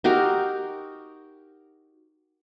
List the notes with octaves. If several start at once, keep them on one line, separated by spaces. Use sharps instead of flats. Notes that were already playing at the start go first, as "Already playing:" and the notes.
D#4 F#4 G4 A#4